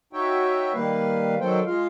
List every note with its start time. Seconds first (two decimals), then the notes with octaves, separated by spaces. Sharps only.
0.13 D#4 F#4 C#5 E5 G5
0.74 D#3 G3 A#3 B4 F5
1.41 D#3 F#3 A4 C5 G5
1.66 G#3 F4 F5